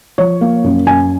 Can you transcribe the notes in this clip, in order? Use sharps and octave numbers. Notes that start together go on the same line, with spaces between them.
F3 C#5
A#3
F#2
F#2 G#5